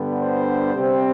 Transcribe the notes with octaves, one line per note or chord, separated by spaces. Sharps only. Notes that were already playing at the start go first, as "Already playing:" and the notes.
Already playing: G2 D3 G3 B3
C5
C3 G3 C4